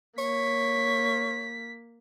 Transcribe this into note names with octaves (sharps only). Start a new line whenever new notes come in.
A#3 C#5 B6